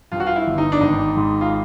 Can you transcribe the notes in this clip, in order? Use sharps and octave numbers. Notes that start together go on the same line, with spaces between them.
G2 F4
F#4
F4
E4
G1
D#4
D4
G#1 D#4
G#2
F4